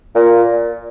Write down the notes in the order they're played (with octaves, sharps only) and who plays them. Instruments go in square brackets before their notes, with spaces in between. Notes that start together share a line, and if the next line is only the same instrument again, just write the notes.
[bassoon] A#2